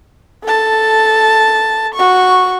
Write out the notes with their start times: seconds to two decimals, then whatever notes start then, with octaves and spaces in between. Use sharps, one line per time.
0.44 A4 A5
1.95 F#4 C#6